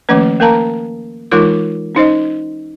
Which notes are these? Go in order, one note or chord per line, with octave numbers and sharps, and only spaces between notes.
D#3 F3 A3 A#3 C#4 B4
A#3 A#4 F5 A5 A#5
E3 G#3 D#4 F4 A#4 D6
C#4 D#4 C5 D#5